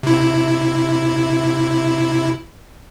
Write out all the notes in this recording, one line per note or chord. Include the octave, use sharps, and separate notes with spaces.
C3 E4